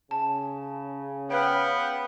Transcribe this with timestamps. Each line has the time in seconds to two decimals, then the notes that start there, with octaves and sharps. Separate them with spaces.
0.11 C#3 A5
1.30 B3 B4 C#5 F5 G5 F6